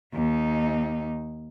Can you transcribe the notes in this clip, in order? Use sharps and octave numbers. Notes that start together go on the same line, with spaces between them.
D#2 D#4